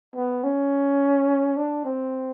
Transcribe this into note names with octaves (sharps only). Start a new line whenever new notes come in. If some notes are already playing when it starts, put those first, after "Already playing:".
B3
C#4
D4
C4